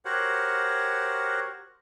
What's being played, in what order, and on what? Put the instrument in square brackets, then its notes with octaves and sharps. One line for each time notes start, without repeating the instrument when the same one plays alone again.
[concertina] F#4 G4 A#4 C5 C#5 F#5